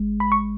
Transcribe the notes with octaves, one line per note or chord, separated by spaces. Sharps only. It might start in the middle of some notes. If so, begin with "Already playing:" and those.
Already playing: G#1 G#3
B5
C#6